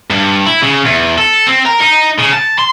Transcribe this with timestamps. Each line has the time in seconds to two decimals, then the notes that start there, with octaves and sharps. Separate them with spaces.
0.10 G2
0.46 E4
0.63 C#3
0.85 E2
1.18 A4
1.47 C4
1.66 A#4
1.81 D#4
2.19 C#3
2.33 A5
2.59 C6